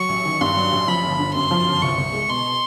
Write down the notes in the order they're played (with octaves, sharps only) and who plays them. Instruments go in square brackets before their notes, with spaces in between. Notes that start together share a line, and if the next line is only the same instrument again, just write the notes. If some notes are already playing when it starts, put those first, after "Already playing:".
Already playing: [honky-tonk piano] F#3 [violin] C#6
[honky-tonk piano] A1
D#3
[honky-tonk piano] G2 [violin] C6
[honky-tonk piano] F#3
A1
[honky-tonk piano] F3 [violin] B5
[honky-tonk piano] G1
D3
[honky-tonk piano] F#2 [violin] C6
[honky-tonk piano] F3
G1
[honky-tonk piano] C2 [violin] C#6
[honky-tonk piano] C2
G#3
[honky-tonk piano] B2 [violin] C6